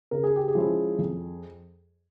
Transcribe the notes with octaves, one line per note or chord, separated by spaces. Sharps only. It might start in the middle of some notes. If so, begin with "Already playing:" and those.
C#3 A#4
G#4
G4
G#4
F3 G#3 C#4 E4
F2